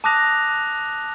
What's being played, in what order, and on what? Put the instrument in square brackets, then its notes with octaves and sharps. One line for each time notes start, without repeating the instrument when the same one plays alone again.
[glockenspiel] A5 D6 D#6 F#6 A#6 F7